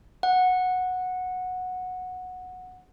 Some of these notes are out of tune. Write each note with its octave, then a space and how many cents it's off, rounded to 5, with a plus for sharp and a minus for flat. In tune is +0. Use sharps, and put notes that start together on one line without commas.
F#5 -10